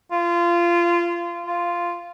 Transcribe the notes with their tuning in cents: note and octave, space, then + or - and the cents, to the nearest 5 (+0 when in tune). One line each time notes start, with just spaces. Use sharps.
F4 -20
F4 -5